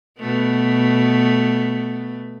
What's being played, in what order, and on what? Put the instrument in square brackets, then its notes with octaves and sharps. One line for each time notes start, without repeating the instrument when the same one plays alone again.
[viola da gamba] B2 A3 B3